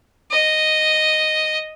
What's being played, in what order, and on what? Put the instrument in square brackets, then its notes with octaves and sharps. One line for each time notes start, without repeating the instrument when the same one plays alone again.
[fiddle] D#5